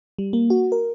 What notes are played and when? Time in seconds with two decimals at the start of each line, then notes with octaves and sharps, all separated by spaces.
0.18 G3
0.33 A#3
0.50 F#4
0.72 A#4